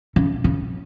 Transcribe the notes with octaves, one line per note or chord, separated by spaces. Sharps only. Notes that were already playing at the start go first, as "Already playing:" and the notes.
C#3
C#3